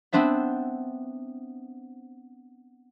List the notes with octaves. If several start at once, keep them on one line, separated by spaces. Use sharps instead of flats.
B3 C4 D4 C5 E5